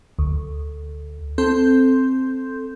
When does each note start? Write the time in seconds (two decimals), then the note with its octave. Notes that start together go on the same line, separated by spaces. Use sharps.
0.19 D2
1.38 C4 A4 C6 G6